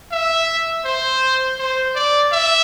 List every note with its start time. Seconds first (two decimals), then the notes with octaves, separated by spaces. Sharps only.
0.12 E5
0.85 C5
1.59 C5
1.95 D5
2.32 E5